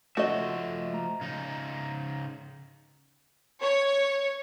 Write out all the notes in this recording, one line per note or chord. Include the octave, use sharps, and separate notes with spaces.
F3 A3 F#4 D#5 E5
A#5
C#3 D#4
C#5